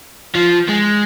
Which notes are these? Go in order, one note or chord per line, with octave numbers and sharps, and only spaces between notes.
F3
G#3